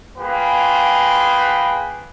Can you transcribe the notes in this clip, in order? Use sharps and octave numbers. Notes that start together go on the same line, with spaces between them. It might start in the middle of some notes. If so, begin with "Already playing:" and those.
A#3 F4 G#4 B4 G5